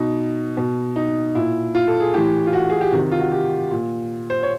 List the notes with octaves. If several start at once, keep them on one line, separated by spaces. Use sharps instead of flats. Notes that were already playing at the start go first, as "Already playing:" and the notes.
Already playing: B2 D#4
B2
D#4
A#2 E4
F4
A4
G#4
A2 E3 G4
F4
F#4
G#4
G4
C3 D#3 F#4
F4
F#4
G4
A#2
C5
C#5